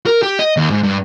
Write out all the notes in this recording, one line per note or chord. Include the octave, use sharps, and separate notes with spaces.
A#4
G4
D#5
D#2
G#2
G2